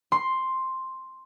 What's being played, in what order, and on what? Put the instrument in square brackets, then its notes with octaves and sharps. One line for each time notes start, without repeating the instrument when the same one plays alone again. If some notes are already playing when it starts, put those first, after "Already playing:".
[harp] C6